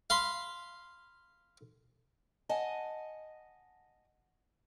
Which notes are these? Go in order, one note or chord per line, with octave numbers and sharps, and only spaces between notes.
F5 B5 C6
D#5 F#5 G#5 A5